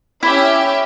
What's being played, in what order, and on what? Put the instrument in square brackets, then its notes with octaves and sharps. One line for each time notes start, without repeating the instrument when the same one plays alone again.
[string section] C#4 G4 E5 [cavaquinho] E4